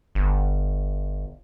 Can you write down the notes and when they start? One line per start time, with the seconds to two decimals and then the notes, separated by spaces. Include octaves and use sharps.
0.15 G1